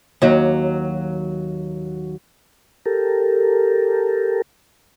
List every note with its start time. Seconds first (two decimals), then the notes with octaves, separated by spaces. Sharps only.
0.22 D#2 F#3
2.86 G4 A4 A#4